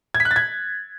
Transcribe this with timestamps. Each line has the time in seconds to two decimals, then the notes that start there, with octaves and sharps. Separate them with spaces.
0.15 G#6
0.20 B6
0.25 F#6
0.31 A6
0.36 G#6